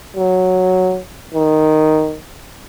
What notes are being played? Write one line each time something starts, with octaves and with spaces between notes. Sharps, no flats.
F#3
D#3